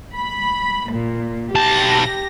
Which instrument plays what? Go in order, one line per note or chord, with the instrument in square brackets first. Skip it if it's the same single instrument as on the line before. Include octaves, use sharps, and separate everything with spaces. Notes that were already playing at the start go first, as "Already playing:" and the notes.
[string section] B5
A#2
[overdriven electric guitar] B1 A5 [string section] G4 A#6